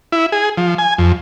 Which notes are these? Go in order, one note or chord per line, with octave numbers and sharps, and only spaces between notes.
E4
G#4
F3
G#5
F2